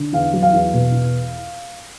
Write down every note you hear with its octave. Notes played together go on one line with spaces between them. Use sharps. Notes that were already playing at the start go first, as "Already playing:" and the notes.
Already playing: D3
E2 F5
F#3
F5
E2
B2
E2